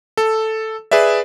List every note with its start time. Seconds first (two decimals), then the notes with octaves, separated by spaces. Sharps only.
0.17 A4
0.91 G#4 B4 D5 E5